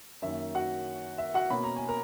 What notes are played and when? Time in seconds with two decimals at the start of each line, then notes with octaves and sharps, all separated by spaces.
0.22 F#2 D#3 A#3 C#4 E5
0.55 F#4 F#5
1.18 E5
1.34 F#4 F#5
1.50 B2 A#3 C#4 B5
1.64 A#5
1.76 G#5
1.89 A#4 A#5